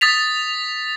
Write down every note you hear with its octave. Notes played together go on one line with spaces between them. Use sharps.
D#6 A6 B6 F7